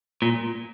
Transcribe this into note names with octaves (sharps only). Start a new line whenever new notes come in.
A#2